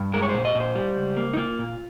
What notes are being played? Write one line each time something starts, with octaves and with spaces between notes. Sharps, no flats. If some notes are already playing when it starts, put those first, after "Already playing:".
Already playing: G2
G#3 A#4
C#5
C5
A#2
D#5
A#2
C5
G3
C#2
A#3
D#4
A#3 F4
A#2